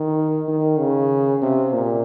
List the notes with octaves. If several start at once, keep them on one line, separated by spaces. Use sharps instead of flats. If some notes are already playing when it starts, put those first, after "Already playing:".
Already playing: D#3
D#3
C#3
C3
A#2